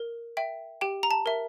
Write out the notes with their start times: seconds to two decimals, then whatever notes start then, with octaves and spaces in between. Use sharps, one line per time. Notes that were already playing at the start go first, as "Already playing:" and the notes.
Already playing: A#4
0.37 E5 G5
0.81 G4 G5
1.03 A#5
1.11 A5
1.26 A#4 E5